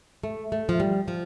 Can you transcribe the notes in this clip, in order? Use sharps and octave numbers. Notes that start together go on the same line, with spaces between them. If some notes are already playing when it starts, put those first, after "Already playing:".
A3
A3
F3
G3
F3